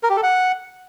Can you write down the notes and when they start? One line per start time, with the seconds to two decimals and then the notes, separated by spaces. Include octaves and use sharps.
0.03 A#4
0.10 G4
0.17 A4
0.23 F#5